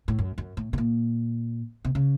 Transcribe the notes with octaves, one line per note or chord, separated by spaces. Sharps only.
A2
F#2
F#2
A2
C3
A#2
C3
C#3